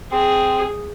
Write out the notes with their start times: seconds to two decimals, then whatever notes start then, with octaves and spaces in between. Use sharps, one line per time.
0.12 C4 G#4